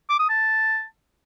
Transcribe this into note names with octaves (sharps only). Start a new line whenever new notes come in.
D6
D#6
A5